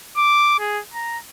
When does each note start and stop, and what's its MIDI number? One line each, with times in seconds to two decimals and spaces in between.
0.17 0.59 86
0.59 0.80 68
0.94 1.18 82